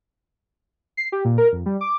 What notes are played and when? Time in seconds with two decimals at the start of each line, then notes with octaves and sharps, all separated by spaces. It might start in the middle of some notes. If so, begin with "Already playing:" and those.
0.97 C7
1.12 G4
1.25 A#2
1.38 A#4
1.52 F2
1.66 G3
1.81 D6